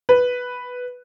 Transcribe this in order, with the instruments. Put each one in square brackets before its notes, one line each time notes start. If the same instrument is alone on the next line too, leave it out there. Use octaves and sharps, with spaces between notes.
[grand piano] B4